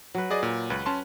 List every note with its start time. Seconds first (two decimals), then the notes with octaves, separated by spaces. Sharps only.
0.15 F#3 B4
0.30 G#4 D5 D#5
0.43 A#2
0.70 C#2 B4
0.86 C#4 A5 C6